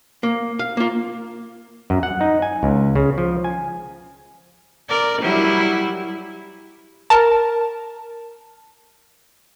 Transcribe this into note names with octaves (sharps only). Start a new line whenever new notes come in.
A#3
F5
A#3 F4
F#2
F#5
D#4
G#5
C#2
C#3
F3
G#5
A#4 D5
F#3 G3 E4
A#4 A5